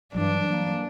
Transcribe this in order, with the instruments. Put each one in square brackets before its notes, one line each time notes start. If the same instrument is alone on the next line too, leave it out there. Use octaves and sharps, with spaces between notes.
[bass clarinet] G2 [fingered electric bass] E3 F#3 G3 [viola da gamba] D4
[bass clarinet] A#3